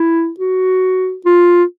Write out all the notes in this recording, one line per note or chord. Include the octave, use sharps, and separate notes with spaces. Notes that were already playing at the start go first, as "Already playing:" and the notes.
Already playing: E4
F#4
F4